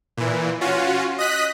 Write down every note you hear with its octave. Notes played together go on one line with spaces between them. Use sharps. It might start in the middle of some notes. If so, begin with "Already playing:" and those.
A#2 E3
C#4 F4 F#4
D#5 D#6 F#6 B6